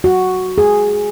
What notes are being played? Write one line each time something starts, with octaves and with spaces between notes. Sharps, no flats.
F#4
G#4